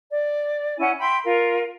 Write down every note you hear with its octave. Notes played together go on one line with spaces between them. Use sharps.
D5
C#4 E4 F#5 G#5
E5 G5 B5 C6
F4 A#4